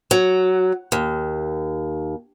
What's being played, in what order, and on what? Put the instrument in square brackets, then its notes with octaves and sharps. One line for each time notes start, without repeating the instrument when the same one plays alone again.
[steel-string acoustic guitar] F#3
D#2